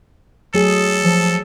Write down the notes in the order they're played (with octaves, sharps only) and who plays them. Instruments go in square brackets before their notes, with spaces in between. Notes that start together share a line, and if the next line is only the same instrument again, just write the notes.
[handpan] F#3 A3 G#4 [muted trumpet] A4
[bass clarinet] F3